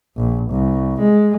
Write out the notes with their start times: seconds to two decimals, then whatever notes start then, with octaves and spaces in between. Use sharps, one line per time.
0.17 A#1
0.51 C2
1.01 G#3